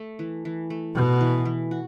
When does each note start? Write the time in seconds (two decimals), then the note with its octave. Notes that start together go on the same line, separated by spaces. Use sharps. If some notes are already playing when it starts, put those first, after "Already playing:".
Already playing: A3
0.19 E3
0.45 E3
0.70 A3
0.95 B2 F#4
1.21 E3
1.45 E3
1.71 F#4